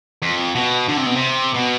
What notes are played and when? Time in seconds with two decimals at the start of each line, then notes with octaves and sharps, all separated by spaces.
0.22 F2
0.55 B2
0.89 D3
0.97 C3
1.06 B2
1.15 C3
1.54 B2